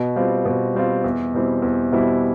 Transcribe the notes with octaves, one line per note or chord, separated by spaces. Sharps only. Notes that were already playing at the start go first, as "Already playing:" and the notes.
Already playing: B2
G3 C4 F4
B2
G3 C4 F4
E2
B2 G3 C4 E4
E2
B2 G3 C4 E4